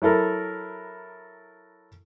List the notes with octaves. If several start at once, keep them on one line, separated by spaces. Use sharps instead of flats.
F#3 E4 A4 A#4